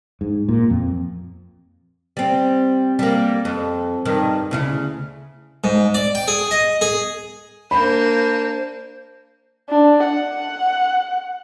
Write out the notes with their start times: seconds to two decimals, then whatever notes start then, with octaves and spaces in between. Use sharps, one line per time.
0.21 G#2
0.49 A#2
0.70 F2
2.17 G3 C4
2.99 G3 A#3
3.45 F2
4.05 G2 D#3
4.51 D2 C#3 E4
5.64 G#2
5.94 D5
6.15 G5
6.28 G#4
6.51 D#5
6.81 G#4
7.71 A#3 D4 C5 B5
9.70 D4
10.04 F#5